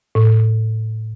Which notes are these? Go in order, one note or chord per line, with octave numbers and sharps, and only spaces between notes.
A2